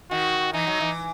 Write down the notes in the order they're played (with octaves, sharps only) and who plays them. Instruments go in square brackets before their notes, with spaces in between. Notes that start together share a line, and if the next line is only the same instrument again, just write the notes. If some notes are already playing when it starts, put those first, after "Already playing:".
[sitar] D#3 [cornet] F#4
[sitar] E3 [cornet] D#4
[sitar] F#3
E3